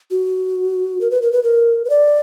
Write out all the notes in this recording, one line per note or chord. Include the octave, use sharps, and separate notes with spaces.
F#4
A#4
B4
A#4
B4
A#4
B4
D5